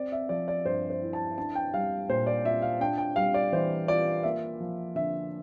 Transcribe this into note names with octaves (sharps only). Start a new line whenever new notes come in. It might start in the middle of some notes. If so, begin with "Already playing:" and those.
Already playing: C4 D5
E5
F3 D5
D5
G2 C5
C5
E4
A5
D4 A5
G5
G3 F5
A#2 C5
D5
F4 E5
F5
D4 G5
G5
G3 F5
D5
E3 C5
F4 D5
A#3 E5
F3
D3 E5